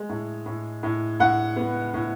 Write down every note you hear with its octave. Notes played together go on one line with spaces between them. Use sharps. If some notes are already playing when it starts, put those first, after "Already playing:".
Already playing: G#3
A2
A2
A2
A2 F#5
B3
A2